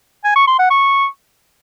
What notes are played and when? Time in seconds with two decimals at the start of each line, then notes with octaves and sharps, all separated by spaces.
0.24 G#5
0.36 C#6
0.47 C6
0.59 F#5
0.70 C#6